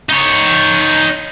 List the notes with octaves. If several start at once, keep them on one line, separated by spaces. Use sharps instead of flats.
D#4 C#5